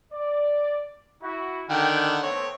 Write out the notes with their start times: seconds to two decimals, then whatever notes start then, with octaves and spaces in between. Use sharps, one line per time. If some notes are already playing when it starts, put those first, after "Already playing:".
0.13 D5
1.23 E4 F#4
1.70 D3 D#3 F#5 G5
2.23 A3 B3 C4 C#5